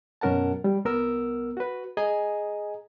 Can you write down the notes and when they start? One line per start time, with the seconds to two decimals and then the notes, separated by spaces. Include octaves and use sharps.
0.21 F#2 B2 C#4 A#4 F#5 A5
0.64 G3
0.85 C2 B3 A#4 E6
1.57 F#4 B4
1.97 G#4 D#5 G#5 A#5